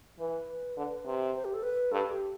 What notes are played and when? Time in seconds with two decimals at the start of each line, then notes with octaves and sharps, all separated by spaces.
0.19 E3 B4
0.77 D3
1.06 C3
1.35 C5
1.45 G4
1.54 A4
1.63 B4
1.92 G2 A4
2.11 G4